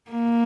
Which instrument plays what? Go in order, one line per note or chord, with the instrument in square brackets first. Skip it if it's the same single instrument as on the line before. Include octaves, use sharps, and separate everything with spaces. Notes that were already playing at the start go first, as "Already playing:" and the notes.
[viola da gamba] A#3